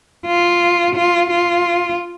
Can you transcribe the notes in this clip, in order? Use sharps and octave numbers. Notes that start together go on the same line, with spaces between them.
F4
F4
F4